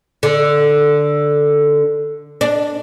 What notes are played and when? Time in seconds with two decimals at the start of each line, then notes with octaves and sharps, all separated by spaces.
0.23 D3
2.41 D4